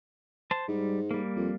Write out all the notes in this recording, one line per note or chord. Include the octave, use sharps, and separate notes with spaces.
C5 A5
G#2 G3
G3 A#3
F2